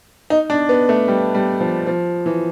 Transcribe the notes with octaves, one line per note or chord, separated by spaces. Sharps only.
D#4
D4
B3
A3
G3
G3
F3
F3
E3